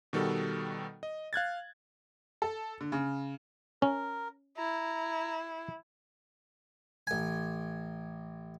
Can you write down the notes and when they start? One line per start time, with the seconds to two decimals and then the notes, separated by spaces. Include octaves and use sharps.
0.13 B2 D#3 G3 F#4 A4
1.03 D#5
1.33 F5 F#6 G#6 A6
2.42 A4
2.81 D3
2.92 C#3
3.82 C#4 A#4
4.58 E4 A#5
7.07 A1 G#5